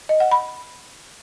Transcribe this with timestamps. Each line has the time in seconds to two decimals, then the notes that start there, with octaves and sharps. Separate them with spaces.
0.09 D#5
0.20 F#5
0.31 B5